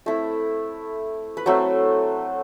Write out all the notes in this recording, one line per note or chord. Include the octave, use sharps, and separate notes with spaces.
A3 C4 E4
B4
F#3 A3 C4 A4